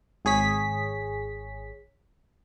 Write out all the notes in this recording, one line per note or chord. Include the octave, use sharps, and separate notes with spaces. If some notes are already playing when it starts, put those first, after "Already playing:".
G#1 G#4 C#5 B6